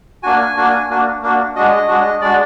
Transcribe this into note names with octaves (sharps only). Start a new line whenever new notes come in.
A#3 D4 F#4 G#5
A#3 D4 F#4
A#3 D4 F#4
A#3 D4 F#4
G#3 D4 F#4 D#5
G#3 D4 F#4
G#3 D4 F#4 D5